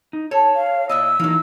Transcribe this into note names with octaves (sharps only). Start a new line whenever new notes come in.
D#4
A4 C#5
F5
A#2 E4 D#5 E6
E3 F#3 A#3 D#4